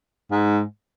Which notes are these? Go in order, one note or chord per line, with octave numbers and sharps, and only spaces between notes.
G#2